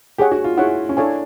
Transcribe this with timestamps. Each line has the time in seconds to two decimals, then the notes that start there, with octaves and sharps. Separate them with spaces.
0.18 G4 G#4 C#5 F#5
0.32 F#4
0.44 F4
0.58 E4 G#4 C#5 F#5
0.89 C#4
0.97 D4 E4 A4 C#5 F5 G#5